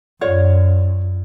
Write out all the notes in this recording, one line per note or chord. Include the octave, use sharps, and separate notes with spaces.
F#2 F4 C#5 D5